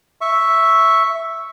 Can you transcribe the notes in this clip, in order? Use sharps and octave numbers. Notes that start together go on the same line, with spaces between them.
E5 C#6